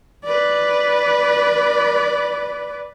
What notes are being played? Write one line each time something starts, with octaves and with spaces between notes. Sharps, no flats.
B4 D5